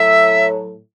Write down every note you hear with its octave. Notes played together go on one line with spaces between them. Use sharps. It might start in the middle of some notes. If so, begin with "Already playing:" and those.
Already playing: A2 F#3 E5